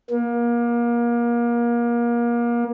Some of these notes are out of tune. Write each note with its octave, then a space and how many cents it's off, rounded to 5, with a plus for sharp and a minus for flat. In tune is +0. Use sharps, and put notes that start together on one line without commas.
A#3 +30